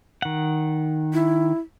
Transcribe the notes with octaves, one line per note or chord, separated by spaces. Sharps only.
D#3 F#5
E4